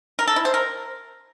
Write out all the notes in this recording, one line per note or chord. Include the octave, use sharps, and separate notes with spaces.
A#4
A4
E4
C5
A#4